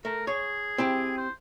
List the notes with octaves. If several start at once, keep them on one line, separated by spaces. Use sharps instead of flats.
A3 A#4
G#4 C#5
C4 E4 G4
C5